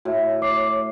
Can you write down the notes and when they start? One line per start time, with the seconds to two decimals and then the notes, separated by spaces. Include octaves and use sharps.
0.05 A2 F#4 E5
0.41 C#5 D6 C7